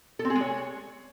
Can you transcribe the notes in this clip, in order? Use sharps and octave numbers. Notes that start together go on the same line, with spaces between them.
A4
C4
G#4
G#3
C#5